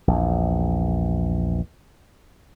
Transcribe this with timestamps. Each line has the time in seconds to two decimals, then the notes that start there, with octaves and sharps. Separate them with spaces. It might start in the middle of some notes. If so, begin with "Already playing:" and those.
0.08 A#1 E2